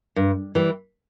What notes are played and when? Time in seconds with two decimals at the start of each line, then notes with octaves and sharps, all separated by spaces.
0.16 G2
0.55 E3 G3